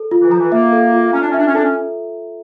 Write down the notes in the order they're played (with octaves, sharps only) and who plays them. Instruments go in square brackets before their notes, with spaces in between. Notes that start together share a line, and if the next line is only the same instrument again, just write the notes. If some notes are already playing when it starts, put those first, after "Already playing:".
Already playing: [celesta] A4
F4
[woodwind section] E3
[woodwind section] F3 [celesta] A#5
[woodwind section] E3
[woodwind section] A#3 [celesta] E5
[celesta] A4
F4
[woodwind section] C#4 [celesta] A#5
[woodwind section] D4
C#4
[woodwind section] D4 [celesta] E5
[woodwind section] C#4
[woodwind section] D4 [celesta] A4
[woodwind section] C#4